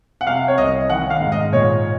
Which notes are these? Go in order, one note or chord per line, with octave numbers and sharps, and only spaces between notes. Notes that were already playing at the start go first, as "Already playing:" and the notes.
F#5
C3 F5
C#5
C2 D#5
D#3 F#5
F5
G#2
D#5
A#2 C#5